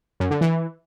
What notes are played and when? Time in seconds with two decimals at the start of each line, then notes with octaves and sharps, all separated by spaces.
0.20 F#2
0.31 D3
0.41 E3